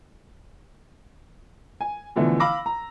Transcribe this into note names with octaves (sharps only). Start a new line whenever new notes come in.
G#5
B2 D3 E3 F3 A3
F5 B5 D6 E6 A#6
A#5